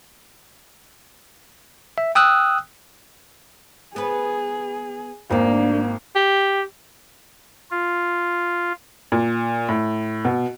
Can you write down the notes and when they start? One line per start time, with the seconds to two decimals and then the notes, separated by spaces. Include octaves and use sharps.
1.98 E5
2.15 G5 D#6 E6 F#6
3.96 B3 G#4 B4
5.31 G#1 D2 A#3 D4
6.16 G4
7.71 F4
9.12 A#2
9.69 A2
10.25 B2